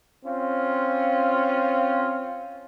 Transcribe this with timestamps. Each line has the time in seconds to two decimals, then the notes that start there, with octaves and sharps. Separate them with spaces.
0.25 C4 C#4 F4